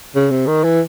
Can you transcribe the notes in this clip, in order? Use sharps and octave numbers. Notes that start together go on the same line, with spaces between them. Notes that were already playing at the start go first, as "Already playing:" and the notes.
C#3
C3
D#3
E3